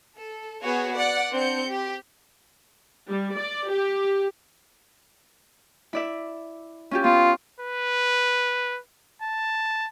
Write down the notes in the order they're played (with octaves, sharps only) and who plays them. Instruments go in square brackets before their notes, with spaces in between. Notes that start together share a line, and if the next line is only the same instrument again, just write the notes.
[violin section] A4
B3 F#4 G#4 C#5
D5 F#5
C4 D4 G6 C#7
G4
[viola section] G3
D5
G4
[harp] E4 D5 E5
C#4 F4 G4
[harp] B3 [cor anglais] F4
[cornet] B4
A5